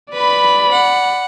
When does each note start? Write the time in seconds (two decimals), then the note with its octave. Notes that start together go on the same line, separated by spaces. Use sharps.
0.13 B4 D5 B5
0.72 F#5